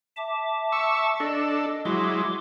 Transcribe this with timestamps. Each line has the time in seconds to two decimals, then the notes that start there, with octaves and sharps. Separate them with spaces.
0.17 E5 A5 D6
0.72 C#6 E6
1.20 D4 A4 D#5
1.85 F#3 G#3 E4 C6 D6